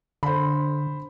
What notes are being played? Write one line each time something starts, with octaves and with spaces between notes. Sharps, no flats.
D3 C5 B5